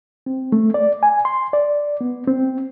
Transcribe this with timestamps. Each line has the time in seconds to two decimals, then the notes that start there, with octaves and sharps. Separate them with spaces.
0.26 C4
0.52 A3
0.74 D5
1.03 G#5
1.25 C6
1.53 D5
2.01 B3
2.27 C4